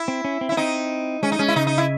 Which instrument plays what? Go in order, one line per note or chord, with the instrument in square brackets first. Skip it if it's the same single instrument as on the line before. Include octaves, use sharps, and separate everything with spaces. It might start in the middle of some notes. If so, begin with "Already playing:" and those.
Already playing: [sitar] E4
[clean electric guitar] C4
C#4
C4
[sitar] E4
[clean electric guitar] C#4
[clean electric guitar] C4 [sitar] D#4
[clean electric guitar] G#3 [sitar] C#4
[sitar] D#4
[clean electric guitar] G#3 [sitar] C#4
[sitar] E4
[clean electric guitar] C#3 [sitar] D#4
[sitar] D#4
E4